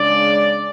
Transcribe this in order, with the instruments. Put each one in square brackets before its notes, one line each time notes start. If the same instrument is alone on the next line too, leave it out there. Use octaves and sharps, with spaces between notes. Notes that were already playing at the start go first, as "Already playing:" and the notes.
Already playing: [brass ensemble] C#3 G#3 D4 D5